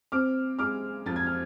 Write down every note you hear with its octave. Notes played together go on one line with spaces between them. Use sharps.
C4 D6 F6
G#3 D6 F6
F2 A6
G#6
F6